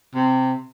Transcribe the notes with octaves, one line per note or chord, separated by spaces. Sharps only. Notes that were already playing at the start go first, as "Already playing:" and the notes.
C3